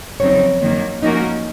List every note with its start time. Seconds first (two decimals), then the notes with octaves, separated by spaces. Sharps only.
0.20 F2 C#3 F#3 C4 D#4 C#5
0.61 F#2 D#3 A#3
1.03 F3 A#3 C#4 D#4 F#4 A#4